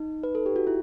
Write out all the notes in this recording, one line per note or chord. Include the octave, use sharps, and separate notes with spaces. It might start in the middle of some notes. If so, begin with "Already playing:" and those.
Already playing: D#4
B4
A4
G4
F#4
E4